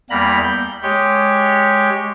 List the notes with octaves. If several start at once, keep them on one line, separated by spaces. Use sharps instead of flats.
E2 G3 A#3 B3 A#5 B5
G6
G#3 G4 C#5